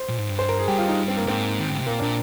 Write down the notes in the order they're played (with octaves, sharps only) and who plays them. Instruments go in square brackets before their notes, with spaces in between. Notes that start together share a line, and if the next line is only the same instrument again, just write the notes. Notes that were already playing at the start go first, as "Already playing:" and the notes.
Already playing: [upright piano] C5
[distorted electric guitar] A#2
G#2
G2
[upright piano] C5
A#4
G#4
[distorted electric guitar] G2 [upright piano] G4
[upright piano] F4
D#4
C4
A#3
[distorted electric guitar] G#2 [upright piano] C4
[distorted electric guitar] D#3
D3
C3
[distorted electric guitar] A#2 [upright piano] A#3
[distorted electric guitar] A#2 [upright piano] D4